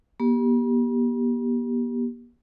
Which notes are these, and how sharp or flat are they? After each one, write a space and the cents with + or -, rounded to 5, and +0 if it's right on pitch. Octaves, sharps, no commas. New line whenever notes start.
B3 -45 G4 +0